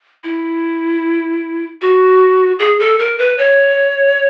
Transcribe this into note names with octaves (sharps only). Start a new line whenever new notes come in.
E4
F#4
G#4
A4
A#4
B4
C#5